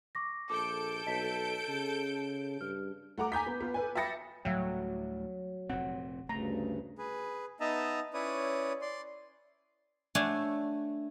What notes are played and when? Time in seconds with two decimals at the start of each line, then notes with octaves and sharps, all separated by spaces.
0.15 C#6 D6 A#6
0.50 A#1 A4 D6 G6 D7
1.06 B1 D#5 A5 B6
1.69 C#3
2.61 G2 F6
3.18 A3 F#5 A#5 D6
3.32 G#5 A#5 G6 B6
3.46 B3
3.61 B3 F4
3.74 A4 B4 G#5
3.95 E5 G5 B5 A6 A#6 C#7
4.45 D2 A2 F#3 G3 E5 F5 G5
5.70 F1 A#2 C4 F#5
6.29 D2 G2 C#3 A3 A#5
6.98 G#4 B4
7.60 B3 D#4 D#5 E5 A5 A#5
8.14 C#4 E4 B4 C#5 D5 D#6
8.81 D5 C6
10.15 A3 D4 C#5 F#5 G#5 A5